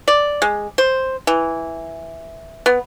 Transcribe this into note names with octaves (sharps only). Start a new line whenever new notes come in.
D5
G#3
C5
E3
B3